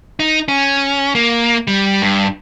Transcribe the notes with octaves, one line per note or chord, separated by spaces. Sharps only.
D#4
C#4
A#3
G3
G2